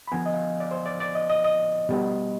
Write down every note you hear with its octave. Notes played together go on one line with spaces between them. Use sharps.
B5
D3 F3 B3 G#5
D#5
F5
D5
C5
D5
D5
D#5
D#5
D#5
B2 G3 B3